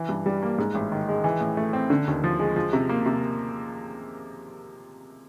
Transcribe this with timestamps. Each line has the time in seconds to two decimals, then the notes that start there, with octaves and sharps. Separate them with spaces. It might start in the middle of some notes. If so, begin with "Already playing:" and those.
Already playing: E3
0.09 G2
0.26 G3
0.43 A#3
0.58 G#2
0.75 A1
0.92 D#3
1.09 G#3
1.24 E3
1.41 A2
1.57 A3
1.73 C4
1.90 D3
2.07 D#2
2.24 F3
2.39 G#3
2.56 F3
2.73 C3
2.89 A#3
3.06 C3